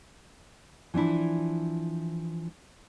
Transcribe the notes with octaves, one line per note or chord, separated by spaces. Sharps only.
E3 F3 D4 E4